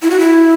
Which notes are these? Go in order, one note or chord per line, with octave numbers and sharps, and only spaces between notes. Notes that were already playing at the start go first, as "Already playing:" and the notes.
E4
F#4
E4